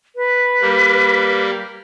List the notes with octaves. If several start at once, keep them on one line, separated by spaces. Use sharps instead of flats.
B4
G3 A#3